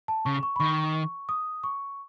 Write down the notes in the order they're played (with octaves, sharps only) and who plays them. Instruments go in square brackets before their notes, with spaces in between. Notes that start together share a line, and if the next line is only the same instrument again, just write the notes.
[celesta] A5
[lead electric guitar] C#3 [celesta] C#6
[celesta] C#6
B5
[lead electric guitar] D#3 [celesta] C#6
[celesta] D#6
C#6